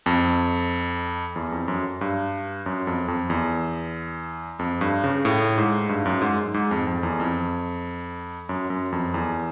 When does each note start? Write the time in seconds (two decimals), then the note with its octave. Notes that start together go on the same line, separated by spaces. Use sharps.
0.06 F2
1.36 E2
1.52 F2
1.68 F#2
2.01 G2
2.66 F#2
2.87 F2
3.08 F2
3.30 E2
4.59 F2
4.81 G2
5.04 C#3
5.25 A2
5.58 G#2
5.89 G2
6.05 F#2
6.22 G#2
6.54 G#2
6.71 F2
6.87 F2
7.03 E2
7.20 F2
8.49 F#2
8.70 F#2
8.92 F2
9.14 E2